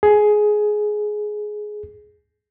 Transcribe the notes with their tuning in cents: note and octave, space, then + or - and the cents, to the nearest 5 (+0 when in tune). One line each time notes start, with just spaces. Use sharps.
G#4 +15